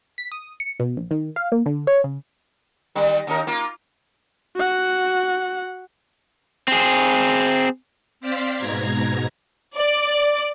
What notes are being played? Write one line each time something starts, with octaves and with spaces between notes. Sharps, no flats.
B6
D#6
C#7
B2
A#1
D#3
F5
A#3
D3
C#5
C#3
D#3 G3
D#2 D#4 A#4
A#3 F4
F#4 F#5
C4 G#4
C4 C5 D5 F5 B6
G#2 B2 A#5 G#6
D5